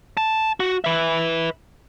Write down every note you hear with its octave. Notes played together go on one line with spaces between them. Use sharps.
A5
F#4
B4 E5